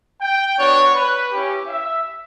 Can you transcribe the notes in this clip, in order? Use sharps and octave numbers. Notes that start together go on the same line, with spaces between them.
G5
B3 D4 F#4 C#5
B4
C#4 E4 G4
E5